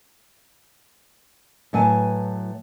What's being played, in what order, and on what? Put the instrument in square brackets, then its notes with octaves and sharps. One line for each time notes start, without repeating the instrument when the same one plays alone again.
[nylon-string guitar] A2 F#3 B4 G#5 A5